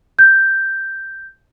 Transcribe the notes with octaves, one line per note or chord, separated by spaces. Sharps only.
G6